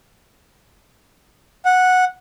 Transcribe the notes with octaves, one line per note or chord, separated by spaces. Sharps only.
F#5